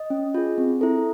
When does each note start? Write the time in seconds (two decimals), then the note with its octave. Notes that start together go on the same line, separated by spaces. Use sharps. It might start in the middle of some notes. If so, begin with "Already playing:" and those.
Already playing: D#5
0.10 C#4
0.34 F4 G#4
0.58 C4
0.81 E4 A4